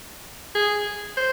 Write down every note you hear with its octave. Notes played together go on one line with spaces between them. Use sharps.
G#4
C5